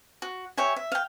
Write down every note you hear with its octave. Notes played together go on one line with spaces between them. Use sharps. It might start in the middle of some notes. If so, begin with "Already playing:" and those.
F#4
G4 C#5 E5 G#5
E5
F5 G5